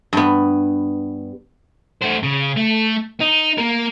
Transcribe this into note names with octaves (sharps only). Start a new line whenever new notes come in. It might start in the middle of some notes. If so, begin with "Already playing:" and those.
G2 B3
A3 C5
C#3
A3
D#4
A#3 A#4